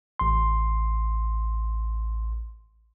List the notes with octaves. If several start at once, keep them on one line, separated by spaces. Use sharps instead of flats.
A1 C6